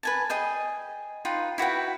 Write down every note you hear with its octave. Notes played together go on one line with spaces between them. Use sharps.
B4 G#5 A5
G#4 D#5 G5
D#4 F4 B4 G5
E4 F#4 B4 G5